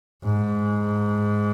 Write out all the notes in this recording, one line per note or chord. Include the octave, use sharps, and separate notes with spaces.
G#2